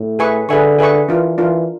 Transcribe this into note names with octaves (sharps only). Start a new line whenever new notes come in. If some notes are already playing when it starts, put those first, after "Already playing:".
Already playing: A2
G#4 B4 E5 G#5 C#6
D3 G#4 B4 E5 G#5 C#6
G#4 B4 E5 G#5 C#6
E3 D4 F4 A#4
E3 D4 F4 A#4